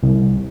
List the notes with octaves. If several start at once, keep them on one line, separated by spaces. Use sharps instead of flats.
C2